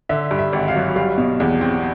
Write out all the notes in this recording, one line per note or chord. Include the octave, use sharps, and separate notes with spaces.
D3 E5
G2
E5
G#1
F5
F#3
G3 F5
B2
E2
C4